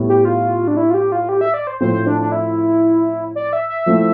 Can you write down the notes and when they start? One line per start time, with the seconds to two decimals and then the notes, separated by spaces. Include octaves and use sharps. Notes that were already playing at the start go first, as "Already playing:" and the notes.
Already playing: A2 G3 B3
0.09 G4
0.25 F4
0.68 D4
0.77 E4
0.90 F4
0.94 G4
1.12 F4
1.29 G4
1.41 E5
1.54 D5
1.67 C5
1.81 A2 F3 A3 C4 F4 C5
2.07 D4
2.21 D4
2.32 E4
3.36 D5
3.53 E5
3.69 E5
3.86 F3 A3 C4 E4